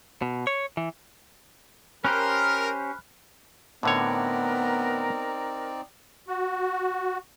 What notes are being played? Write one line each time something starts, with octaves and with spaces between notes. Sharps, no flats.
B2
C#5
E3
C#4 G4 A#4 C5 B5 F6 F#6
A2 D3 B3 C4 D#4 A#4 C#5 D5
F#4